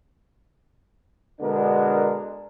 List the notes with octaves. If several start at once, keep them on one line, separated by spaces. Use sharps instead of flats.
B2 D3 G#3 B3 D4 A#4